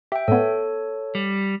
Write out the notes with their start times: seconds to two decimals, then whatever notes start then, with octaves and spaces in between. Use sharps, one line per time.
0.12 G4 E5 G5
0.28 A2 B3 A4 C#5
1.15 G3